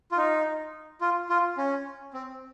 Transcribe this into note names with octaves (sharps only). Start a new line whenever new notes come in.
F4
D#4
F4
F4
C#4
C4